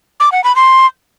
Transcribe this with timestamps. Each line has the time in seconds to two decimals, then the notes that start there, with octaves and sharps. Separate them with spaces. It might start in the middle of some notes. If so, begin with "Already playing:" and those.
0.20 D6
0.32 F#5
0.44 B5
0.56 C6